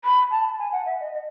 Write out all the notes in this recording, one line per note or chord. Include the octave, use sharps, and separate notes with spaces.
B5
A5
G#5
F#5
E5
D#5
D#5